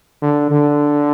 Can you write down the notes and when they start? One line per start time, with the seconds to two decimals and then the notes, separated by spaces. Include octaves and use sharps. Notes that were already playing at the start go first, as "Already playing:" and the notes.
0.22 D3
0.51 D3